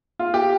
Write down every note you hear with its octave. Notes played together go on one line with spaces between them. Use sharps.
F4
G4